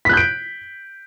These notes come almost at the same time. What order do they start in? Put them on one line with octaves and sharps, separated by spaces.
B6 F#6 G6 D7